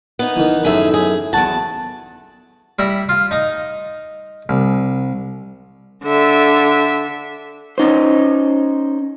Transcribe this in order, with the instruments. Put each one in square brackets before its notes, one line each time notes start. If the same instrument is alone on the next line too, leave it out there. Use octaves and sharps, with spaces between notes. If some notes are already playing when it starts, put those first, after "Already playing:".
[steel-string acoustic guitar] B3 D#4
[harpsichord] D#3 E3
[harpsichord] F#2 A2 D#3 [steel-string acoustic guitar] G#4 E5
[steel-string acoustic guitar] G#4
[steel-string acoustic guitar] E2 A5 [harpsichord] F#4 F#5
[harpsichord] G3 E4 A#5 B5
F4
D#4 A#5 D#6
C2
[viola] D3 E5
[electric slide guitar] C#4 D#4 C5